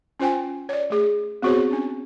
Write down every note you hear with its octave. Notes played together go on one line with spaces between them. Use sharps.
C#4 F4 C5 G5 G#5
C#5 D5
A3 G#4
B3 C4 F#4 G#4 C5 C#5
C#4 D4